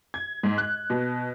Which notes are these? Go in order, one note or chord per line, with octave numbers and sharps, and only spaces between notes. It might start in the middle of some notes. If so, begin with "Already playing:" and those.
G#6
G#2
F#6
B2